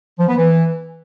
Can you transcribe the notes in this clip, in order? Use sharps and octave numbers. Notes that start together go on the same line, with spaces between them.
F3
B3
E3